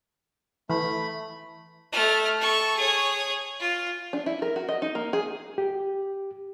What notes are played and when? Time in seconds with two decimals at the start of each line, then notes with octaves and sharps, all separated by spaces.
0.70 E3 A3 B5
1.92 A3 F6
2.40 A4 C#6
2.76 G#4 C#5
3.60 F4
4.13 D4
4.26 E4
4.42 A#4
4.56 F#4
4.69 D#5
4.82 D#4
4.95 A#3
5.13 G#4
5.58 G4